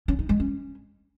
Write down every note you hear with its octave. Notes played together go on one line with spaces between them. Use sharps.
C#4
D#4
G#3
C#4